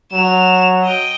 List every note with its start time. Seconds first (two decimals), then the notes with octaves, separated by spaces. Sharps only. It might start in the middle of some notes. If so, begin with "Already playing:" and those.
0.13 F#3 E7 F7
0.83 D#5 G5